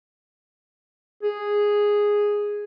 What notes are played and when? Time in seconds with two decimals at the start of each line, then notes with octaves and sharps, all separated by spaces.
1.23 G#4